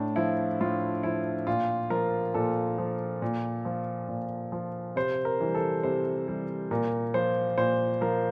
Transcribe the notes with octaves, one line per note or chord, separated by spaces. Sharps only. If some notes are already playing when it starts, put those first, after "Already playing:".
Already playing: A2 D4
F3 E4
A2 F4
F3 E4
A#2 F4
F3 A#4
A#2 A4
F3
A#2
F3
A#2
F3
C3 C5
A#4
E3 G3
A4
C3 C5
E3 G3
A#2 A#4
F3 C5
A#2 C5
F3 A#4